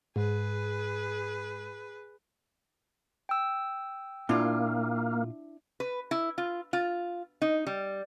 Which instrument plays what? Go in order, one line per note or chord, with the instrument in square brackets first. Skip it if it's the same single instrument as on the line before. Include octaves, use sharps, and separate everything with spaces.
[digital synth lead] G#2 [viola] G#4 B4
[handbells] G5 E6
[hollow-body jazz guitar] A#2 F4 [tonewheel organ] A#3 [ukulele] D4 E4
[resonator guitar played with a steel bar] B4
E4
F4
F4
D#4
G3